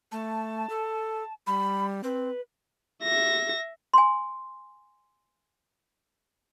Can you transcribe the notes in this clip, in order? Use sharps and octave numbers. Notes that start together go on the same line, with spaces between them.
A3 A5
A4
G3 B5
C4 B4
E5 A#6
G#5 C6